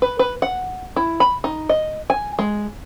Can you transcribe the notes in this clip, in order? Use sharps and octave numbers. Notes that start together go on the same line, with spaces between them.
B4
B4
F#5
E4
B5
D#4
D#5
G#5
G#3